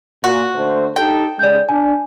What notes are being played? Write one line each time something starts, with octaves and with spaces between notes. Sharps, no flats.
A#2 F#4
D3 A3 C5
D#4 G4 A4 G5
C#3 G#3 D5 G6
D4 G#5